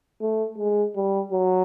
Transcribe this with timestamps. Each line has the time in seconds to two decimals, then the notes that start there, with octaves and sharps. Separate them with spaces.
0.21 A3
0.58 G#3
0.96 G3
1.32 F#3